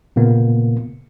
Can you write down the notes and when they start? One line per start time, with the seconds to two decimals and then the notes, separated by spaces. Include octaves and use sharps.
0.16 A#2 C#3 A#3 B3